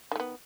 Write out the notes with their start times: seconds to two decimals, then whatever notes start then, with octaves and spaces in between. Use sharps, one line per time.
0.11 D#3
0.16 A3
0.20 B3